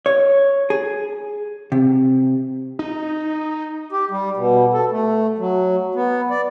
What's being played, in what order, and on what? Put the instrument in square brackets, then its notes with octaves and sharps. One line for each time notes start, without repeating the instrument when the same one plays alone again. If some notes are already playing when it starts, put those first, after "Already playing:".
[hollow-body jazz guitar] C#5
G#4
C3
[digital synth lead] D#4
[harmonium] G4
G3
B2
A4
A3
F#3
B3
D5